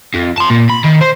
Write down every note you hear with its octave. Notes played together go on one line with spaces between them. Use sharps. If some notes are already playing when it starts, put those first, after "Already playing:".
F2
A5 C6
A#2
B5
D#3
C5